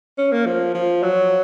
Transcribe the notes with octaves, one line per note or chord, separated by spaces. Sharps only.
C#4
A#3
F3
F3
F#3